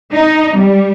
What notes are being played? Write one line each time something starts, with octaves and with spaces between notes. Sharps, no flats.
D#4
G3